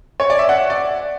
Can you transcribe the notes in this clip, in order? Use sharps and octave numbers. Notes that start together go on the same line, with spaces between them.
C#5
D5
E5
F#5
D5